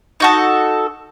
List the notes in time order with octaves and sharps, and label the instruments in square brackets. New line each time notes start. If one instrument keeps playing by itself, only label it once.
[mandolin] D#4 F#4 A4